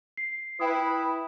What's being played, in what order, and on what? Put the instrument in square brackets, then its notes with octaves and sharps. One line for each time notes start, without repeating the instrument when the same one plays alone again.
[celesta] C7
[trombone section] E4 B4 [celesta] G5 D#6